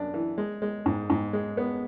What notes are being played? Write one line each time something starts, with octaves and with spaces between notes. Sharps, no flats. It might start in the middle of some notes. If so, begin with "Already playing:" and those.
Already playing: F#2 D4
E3
G#3
G#3
G#2
G#2
G#3
B3